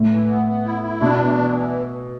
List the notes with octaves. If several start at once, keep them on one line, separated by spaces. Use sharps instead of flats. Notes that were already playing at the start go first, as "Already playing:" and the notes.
Already playing: A2
E3
B3
B3
E4
E4
B2 D4
E3
E3